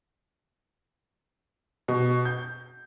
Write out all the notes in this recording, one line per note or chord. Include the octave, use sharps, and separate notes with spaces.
B2
G6